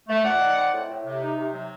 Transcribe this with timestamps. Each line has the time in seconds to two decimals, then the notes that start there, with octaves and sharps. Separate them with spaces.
0.08 A3
0.24 A#2 D5 F#5
0.41 D#4
0.56 C4
0.73 A2
0.89 A2
1.05 C3
1.21 D#4
1.37 C3
1.52 F#3